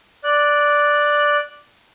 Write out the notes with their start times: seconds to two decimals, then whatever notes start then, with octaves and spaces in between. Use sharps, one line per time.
0.24 D5 F#6